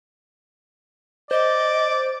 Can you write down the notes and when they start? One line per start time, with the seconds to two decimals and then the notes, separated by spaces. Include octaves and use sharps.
1.31 C5 D5 D#5